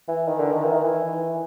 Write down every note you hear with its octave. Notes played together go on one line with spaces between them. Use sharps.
E3
D#3
D3
D#3
E3
D#3
E3